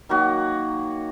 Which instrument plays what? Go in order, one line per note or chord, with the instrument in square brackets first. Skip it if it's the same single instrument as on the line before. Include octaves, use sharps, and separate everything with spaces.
[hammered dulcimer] D#3 F#3 A#3 F#4